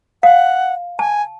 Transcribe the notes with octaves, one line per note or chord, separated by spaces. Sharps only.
F5 F#5
G#5 A5